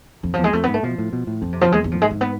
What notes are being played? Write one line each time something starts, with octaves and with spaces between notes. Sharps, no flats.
F2 E3
E2 F3
G#3
F2 A3
G#2 B3
A3
B2 F3
A2
B2
A2
F2 E3
C3
F3
E2 G#3
G#3
A2 F3
G#2 G#3
A3
B3